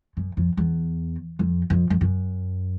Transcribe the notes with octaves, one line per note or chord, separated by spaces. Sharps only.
F#2
F2
E2
F2
F2
F2
F#2